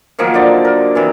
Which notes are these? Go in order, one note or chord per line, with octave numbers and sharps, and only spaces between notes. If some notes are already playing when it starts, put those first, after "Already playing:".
D#3 F3 F#3 A#3
D3 D#4 D5
A#4
C3 D#3 E3